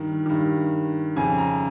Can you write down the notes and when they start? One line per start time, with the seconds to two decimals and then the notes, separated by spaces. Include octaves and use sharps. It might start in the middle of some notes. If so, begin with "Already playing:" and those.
Already playing: G2 D#3
0.26 G2 D#3
1.16 F2 C#3 G#5
1.38 A#5